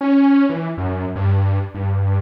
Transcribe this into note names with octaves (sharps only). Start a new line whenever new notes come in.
C#4
E3
F#2
G2
G2